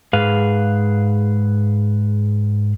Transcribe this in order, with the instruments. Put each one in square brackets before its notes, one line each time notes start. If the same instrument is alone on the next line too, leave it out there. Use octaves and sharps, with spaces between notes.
[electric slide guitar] G#2 G#4 B4 F5